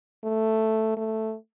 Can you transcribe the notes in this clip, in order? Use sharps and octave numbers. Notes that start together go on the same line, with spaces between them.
A3
A3